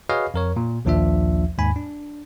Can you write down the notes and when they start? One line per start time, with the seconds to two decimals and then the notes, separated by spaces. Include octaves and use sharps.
0.09 F#4 G#4 B4 C#5 D#5 F5
0.34 F2 A#4 C#5
0.56 A#2
0.85 A#1 D#2 F3 D4 F4 E5
1.58 D#2 G#2 G#5 B5
1.76 D4